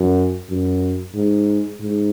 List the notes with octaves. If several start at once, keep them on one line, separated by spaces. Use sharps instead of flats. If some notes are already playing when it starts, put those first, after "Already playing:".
Already playing: F#2
F#2
G#2
G#2